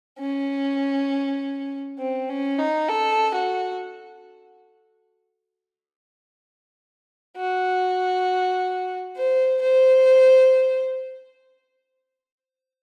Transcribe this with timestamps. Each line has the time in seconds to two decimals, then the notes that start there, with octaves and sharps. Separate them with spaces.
0.19 C#4
1.99 C4
2.29 C#4
2.59 D#4
2.89 A4
3.34 F#4
7.37 F#4
9.17 C5
9.62 C5